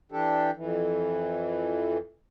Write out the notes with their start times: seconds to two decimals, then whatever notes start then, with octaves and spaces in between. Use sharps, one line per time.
0.12 E3 D4 G4 A4
0.56 F2 E3